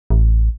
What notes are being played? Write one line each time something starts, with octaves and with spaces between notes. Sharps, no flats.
A1